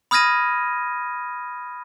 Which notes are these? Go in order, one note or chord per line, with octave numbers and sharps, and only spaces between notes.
B5 D#6 F6 G#6 A#6 D#7